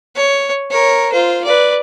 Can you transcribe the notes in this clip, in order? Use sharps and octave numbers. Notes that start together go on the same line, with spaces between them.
C#5
A#4 C#5
F4 C5
B4 D5